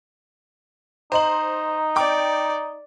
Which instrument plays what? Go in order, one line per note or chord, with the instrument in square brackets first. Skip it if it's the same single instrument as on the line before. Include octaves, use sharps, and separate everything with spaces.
[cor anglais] D#4 [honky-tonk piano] C5 F#7 [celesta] D#5 A#5
[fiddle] D5 [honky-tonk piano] G5 D6